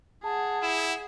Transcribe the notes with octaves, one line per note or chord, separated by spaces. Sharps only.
G#4 F#5 A5
E4 E7